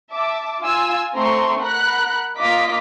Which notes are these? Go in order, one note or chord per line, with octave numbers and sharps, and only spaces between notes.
E5 A5 D6
F4 G#5 E6
A3 C4 A#5 C6 C#6
A#4 F#5 B5 F#6
A#3 F4 D#5 D6 B6